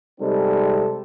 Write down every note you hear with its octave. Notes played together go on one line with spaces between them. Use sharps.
C3 G3 G#3 C4 D#4 A4